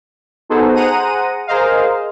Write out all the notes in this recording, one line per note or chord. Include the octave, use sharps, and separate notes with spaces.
B3 D#4 F#4 G#4 A4 C5
G#4 C5 F#5 A#5 D#7
G#4 A#4 C5 D#5 F5